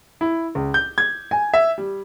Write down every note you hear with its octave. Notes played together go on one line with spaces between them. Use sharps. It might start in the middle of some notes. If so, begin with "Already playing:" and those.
E4
C#2
G6
G#6
G#5
E5
G3